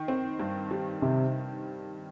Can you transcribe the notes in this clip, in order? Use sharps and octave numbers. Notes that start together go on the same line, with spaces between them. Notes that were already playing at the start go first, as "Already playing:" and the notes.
Already playing: D#3
C4
G2
G3
C3 D#3